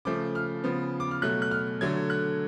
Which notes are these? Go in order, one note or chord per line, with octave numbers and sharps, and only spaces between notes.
C#3 F3 A3 D6
F6
C#3 F3 B3
D6
F6
B2 F#3 A3 F#6
F#6
F6
D3 F#3 A3 G#6
F#6